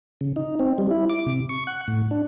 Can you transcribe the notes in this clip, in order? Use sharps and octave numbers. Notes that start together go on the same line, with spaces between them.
C#3
D#4
C4
G3
E4
D6
C3
C#6
F#5
A2
D4